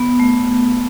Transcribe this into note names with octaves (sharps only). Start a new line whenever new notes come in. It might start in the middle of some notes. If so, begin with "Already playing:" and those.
Already playing: B3
A3